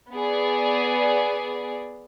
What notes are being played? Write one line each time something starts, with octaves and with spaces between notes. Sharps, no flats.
B3 G#4 D5